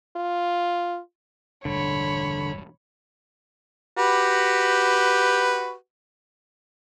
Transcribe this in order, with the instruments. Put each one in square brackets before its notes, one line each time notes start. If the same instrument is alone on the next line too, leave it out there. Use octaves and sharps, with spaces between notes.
[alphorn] F4
[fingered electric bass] E1 A1 G2 [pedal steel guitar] D3 [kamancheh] C#5 B5
[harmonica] F#4 G4 B4